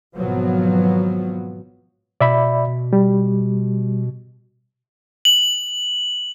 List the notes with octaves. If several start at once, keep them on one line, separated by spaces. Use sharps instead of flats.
G#1 B2 F3 F#3 B3
B2 D5 E5 B5
G3
F#7